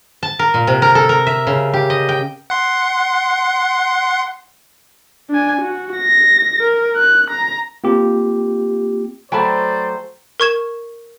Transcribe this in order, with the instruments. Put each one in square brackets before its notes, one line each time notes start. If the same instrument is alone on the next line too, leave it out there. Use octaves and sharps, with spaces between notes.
[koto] A5
A#4
A#2
C3
A#4
A4
A#4
E5
C#3
G4
D#5
G5
[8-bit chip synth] F#5 C6
[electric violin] D4 G#5
F#4
A#6
A#4
F#6
A#5
[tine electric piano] A#3 C4 F4 G4
[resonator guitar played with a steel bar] F#3 A3 [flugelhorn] C5 [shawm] D5 [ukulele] G5 A5 B5
[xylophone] A#4 C#6 G#6 E7